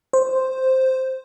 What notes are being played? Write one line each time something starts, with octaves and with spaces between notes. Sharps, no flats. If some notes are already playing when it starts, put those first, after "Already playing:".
C5